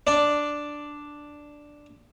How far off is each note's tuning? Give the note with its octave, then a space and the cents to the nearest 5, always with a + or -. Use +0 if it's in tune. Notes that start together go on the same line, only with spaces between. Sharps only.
D4 +0 D5 +0